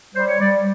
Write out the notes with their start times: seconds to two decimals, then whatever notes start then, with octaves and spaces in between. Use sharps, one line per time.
0.15 G3 C5
0.28 C#5
0.40 G3 D5